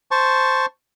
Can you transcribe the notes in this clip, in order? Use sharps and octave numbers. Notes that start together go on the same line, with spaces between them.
C5 A5 C#6